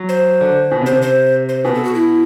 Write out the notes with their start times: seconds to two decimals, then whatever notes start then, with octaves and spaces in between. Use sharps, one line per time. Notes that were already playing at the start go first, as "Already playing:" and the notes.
Already playing: F#3
0.09 C5
0.41 D3
0.71 B2
0.82 C3
0.86 C5
0.92 C3
1.02 C5
1.49 C5
1.65 B2 B4
1.75 A4
1.85 F#4
1.94 E4